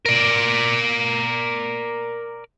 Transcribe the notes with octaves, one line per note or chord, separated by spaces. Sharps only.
A#4 D5